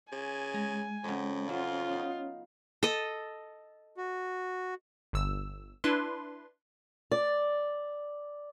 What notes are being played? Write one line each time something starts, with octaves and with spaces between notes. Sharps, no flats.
C#3 G#5
G#3 A#5
F2 C#3 F#3
F#3 C#4 F4 C#5
B3 D#4
A4 D#5
F#4
G1 E6
D4 E4 B4 C6
D5